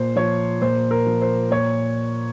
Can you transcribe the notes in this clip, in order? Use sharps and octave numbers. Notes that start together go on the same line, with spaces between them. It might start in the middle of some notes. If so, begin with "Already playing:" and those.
Already playing: A#2 C5
F3 C#5
A#2 C5
A#4
F3
C5
A#2 C#5